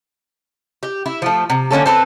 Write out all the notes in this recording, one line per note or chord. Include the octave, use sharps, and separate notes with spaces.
G4
E4
F3 A3
C3
D3 A#3 C#4 A4
C4 A4 B4